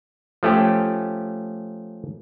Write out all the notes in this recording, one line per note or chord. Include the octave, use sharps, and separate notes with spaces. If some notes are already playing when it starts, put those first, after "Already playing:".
F3 A3 C#4 G4